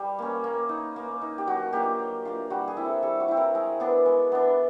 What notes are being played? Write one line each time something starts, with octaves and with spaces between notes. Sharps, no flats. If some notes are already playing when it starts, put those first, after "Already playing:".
Already playing: G3
A#3 C#4
A#3
D#4
A#3
D#4
G4
F#3 F#4
A#3 D4 F4 G4
F#3
A#3 D4 F4
G3 F#4
G#4
C4 E4
A4
G3 A4
F#4
C4 E4
A#4
G#3
B3 D4
G#3
B3 D4